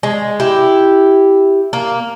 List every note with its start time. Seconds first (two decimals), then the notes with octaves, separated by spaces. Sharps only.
0.03 G#3
0.40 E4 G4
1.73 A#3